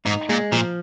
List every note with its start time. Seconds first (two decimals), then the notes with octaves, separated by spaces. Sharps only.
0.05 G#2 D#4
0.29 A#2 G#3
0.52 A#2 F3